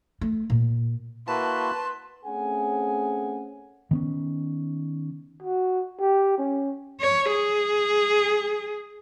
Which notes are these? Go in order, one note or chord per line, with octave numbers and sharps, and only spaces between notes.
A3
A#2
A#3 E4 F#4 B4 A5 C6
A3 C4 C#4 G#4 F#5 G#5
D#3 B3 C#4
F#4
G4
C#4
C#5
G#4